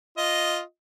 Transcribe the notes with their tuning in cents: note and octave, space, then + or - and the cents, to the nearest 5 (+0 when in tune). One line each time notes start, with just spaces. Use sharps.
F4 +0 D#5 +0